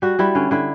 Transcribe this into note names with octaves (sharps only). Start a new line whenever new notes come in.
G3 F#4
G3 E4
D3 C#4
D3 E4